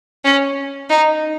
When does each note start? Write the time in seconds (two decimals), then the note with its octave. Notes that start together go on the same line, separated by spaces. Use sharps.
0.24 C#4
0.90 D#4